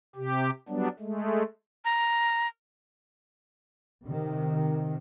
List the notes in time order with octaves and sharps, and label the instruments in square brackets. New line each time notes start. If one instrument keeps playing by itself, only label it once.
[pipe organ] C3 G4
F#3 G3 B3 D4
G#3 A3
[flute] A#5
[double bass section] C3 D#3